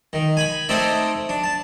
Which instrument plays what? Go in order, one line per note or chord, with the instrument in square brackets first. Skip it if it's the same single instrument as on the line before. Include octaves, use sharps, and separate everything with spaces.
[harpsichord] D#3
G#5 B5
A3 C4 D#4 D5 E5
D4
A5